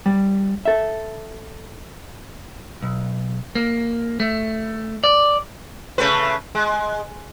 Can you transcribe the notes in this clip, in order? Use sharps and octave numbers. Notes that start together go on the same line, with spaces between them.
G3
A4 E5
B1
A#3
A3
D5
C#3 A3 B4
G#3